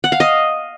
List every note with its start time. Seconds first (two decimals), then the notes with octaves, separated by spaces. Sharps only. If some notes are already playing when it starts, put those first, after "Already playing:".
0.04 F#5
0.12 F5
0.20 D#5